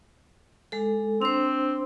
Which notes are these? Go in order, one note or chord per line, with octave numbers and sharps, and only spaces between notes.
G#3 A4
C4 D4 C5